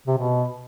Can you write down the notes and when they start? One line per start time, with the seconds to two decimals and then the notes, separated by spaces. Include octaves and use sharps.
0.07 C3
0.18 B2